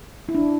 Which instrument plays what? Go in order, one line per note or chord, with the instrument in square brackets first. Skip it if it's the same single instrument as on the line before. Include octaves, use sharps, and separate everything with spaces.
[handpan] E4
D4